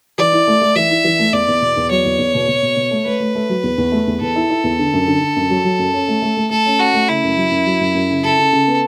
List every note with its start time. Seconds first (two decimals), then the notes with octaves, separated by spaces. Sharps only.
0.18 E3 D5
0.33 E4
0.47 A3
0.61 A3
0.76 E3 E5
0.90 E4
1.04 E3
1.19 A3
1.33 E2 D5
1.48 E2
1.62 B2
1.77 E2
1.91 F#3 C#5
2.05 E2
2.19 E2
2.34 B2
2.48 B2
2.62 B2
2.76 B2
2.91 A3
3.05 A3 B4
3.20 A3
3.35 A3
3.49 F#3
3.63 E2
3.78 E2
3.92 A3
4.07 E2
4.21 E2 A4
4.36 E4
4.50 E4
4.64 E2
4.79 D3
4.93 F#2
5.07 D3
5.21 D3
5.36 F#2
5.50 F#3
5.65 F#3
5.79 F#2
5.94 C#4
6.08 A3
6.22 A3
6.37 A3
6.51 A3 A4
6.66 C#4
6.79 C#4 F#4
6.94 A3
7.09 C#3 E4
7.24 F#2
7.37 F#3
7.51 F#2
7.66 F#3
7.81 F#2
7.95 F#2
8.10 C#3
8.24 C#3 A4
8.38 C#3
8.53 C#3
8.67 B3